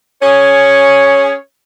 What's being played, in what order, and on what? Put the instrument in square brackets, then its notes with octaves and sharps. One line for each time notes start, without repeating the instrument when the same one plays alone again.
[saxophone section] C#4 G#4 C#5